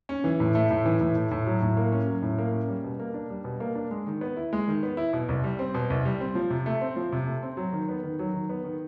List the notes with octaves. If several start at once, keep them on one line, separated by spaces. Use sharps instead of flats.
C#4
E3
A2
A3
A2
E3
A2
A3
A2
F#3
A2
A#3
C#4
F#3
A2
A#3
C#4
G3
B2
A#3
D4
G3
B2
A#3
D4
G#3
D#3
B3
E4
G#3
D#3
B3
E4
B2
C2
G3
C4
B2
C2
G3
C4
F3
C3
A3
C4
F3
C3
A3
C4
F#3
D#3
B3
D#3
F#3
D#3
B3
D#3